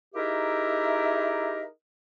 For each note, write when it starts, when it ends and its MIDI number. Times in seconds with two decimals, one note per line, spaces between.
0.15 1.64 63
0.15 1.64 64
0.15 1.64 67
0.15 1.64 68
0.15 1.64 70
0.15 1.64 76